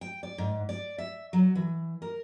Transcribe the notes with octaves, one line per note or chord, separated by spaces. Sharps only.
G5
D5
G#2
D5
E5
F#3
E3
A#4